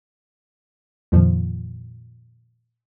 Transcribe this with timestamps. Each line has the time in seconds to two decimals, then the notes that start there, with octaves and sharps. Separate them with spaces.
1.12 F2 A#2 D#3 F3